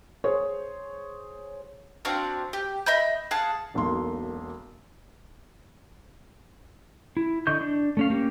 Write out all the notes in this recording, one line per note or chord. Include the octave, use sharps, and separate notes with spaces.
G#4 C5 C#5
C4 D4 F#4 F5
G4
D#5 E5 B5 G6
G#4 F5 F#5 A5
E1 B1 A#3 C6
E4
D3 D#5 C#6 G6
D4
A3 C#4 F5
A#3 C#4 G4